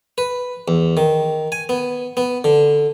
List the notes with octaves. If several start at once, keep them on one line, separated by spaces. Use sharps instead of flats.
B4
E2
D#3
G#5
B3
B3
D3